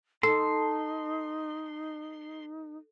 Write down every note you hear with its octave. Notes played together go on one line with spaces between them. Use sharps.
D#4 A4 C6